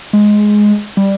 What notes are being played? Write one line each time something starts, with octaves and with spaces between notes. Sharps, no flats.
G#3
G3